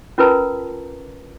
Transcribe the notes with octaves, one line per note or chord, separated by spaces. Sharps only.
C#4 F4 A#4 B4 A5 A#5